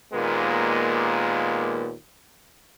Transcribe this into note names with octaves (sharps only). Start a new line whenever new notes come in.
D#2 A#2 G#3 A#3 B3